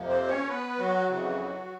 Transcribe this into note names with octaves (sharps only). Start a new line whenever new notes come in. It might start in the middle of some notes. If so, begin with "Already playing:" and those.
Already playing: F2 C3 F3 A#3
C4 C5
C#4 C#5
B3 B4
F#3 F#4
F2 C#3 E3